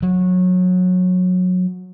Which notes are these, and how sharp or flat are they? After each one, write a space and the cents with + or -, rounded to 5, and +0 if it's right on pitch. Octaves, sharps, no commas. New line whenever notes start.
F#3 -20